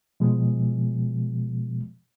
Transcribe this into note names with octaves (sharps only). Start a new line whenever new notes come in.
B2 F3 G#3